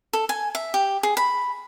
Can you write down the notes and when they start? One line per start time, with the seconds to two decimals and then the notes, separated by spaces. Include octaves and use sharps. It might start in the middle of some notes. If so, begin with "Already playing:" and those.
0.13 A4
0.29 G#5
0.55 E5
0.74 G4
1.03 G#4
1.17 B5